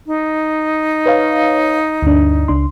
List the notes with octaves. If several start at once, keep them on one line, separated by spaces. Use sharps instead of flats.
D#4
B4 C#5 F5
D2 G2 D4
C#2 D4 C6